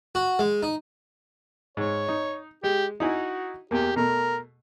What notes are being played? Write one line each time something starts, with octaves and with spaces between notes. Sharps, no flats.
F#4
G#3
D#4
G#2 C#5
D#4
G#3 G4
D#4 E4 F#4 G#5
E2 A#3 G4
B2 A3 A#4